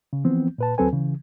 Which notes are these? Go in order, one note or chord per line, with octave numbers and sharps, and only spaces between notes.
C#3
E3 F3 B3 C4
A#2 B4 A5
D2 F#3 C4 A4 B4 G#5
C#3 E3